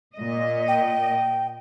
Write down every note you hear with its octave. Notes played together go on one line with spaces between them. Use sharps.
A#2 D#5
G5